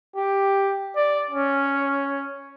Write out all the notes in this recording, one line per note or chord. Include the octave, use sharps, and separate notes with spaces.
G4
D5
C#4